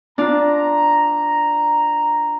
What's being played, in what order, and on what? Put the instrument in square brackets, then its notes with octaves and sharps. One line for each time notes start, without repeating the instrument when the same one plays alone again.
[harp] D4 F4 [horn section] A#5